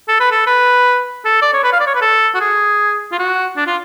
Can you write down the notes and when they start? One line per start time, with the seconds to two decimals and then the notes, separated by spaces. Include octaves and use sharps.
0.08 A4
0.20 B4
0.31 A4
0.47 B4
1.25 A4
1.42 D5
1.53 C#5
1.64 B4
1.73 F5
1.80 D5
1.87 C#5
1.95 B4
2.02 A4
2.34 F#4
2.41 G#4
3.12 F4
3.19 F#4
3.57 D4
3.67 F4